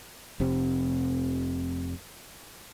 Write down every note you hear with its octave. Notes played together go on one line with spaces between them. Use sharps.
F1 C3 C4